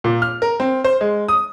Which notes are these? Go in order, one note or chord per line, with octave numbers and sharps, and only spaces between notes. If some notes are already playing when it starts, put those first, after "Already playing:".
A#2
F6
A#4
C4
C5
G#3
D#6